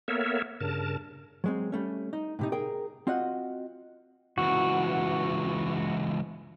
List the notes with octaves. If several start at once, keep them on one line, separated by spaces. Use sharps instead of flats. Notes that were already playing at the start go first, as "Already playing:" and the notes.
A#3 B3 A4 A#4 C#5 E5
G2 C#3 A#4 A5
F#3 G#3 C4
G3 A3 C#4
D#4
A2 C3 D#4
G#4 A#4 G5
C4 F4 F#4 D#5 F#5
C#2 E3 F#4